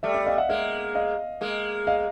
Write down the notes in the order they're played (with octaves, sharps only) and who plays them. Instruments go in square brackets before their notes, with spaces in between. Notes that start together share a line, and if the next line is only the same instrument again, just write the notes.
[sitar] G3 A3 [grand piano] D5 E5
[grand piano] D5 E5
D#5 F5
E5 F#5
[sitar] G#3 A#3 [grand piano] E5 F#5
[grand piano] D#5 F5
[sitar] G#3 A#3
[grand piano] D#5 F5